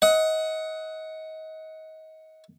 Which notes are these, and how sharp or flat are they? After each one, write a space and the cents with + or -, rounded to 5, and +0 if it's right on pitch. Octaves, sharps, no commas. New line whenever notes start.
D#5 +30 F#5 +0